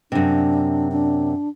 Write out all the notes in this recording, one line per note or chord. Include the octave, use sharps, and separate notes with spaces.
F#2 C3 D4
D4